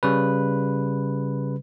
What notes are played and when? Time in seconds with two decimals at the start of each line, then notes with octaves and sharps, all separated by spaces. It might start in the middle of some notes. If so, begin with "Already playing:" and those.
0.03 C#3 G3 B4